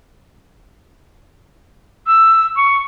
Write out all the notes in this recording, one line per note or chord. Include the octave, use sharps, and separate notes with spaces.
E6
C#6